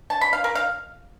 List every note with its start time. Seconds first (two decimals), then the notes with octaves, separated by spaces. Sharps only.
0.10 A5
0.21 B5
0.33 F5
0.44 A#4
0.55 F5